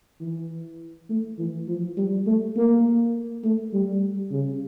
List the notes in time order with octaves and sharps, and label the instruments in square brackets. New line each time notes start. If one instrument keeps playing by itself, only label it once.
[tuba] E3
A3
E3
F3
G3
A3
A#3
A3
G3
C#3